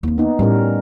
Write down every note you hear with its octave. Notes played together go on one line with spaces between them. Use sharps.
D#2 C4
B3 D#4
A2 G3 C#4 A#4